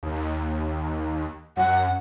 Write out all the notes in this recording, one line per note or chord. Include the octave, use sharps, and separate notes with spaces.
D#2
F#2 F#5